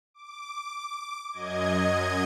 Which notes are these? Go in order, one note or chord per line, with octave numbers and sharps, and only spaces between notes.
D6
F#2 D#5 G#6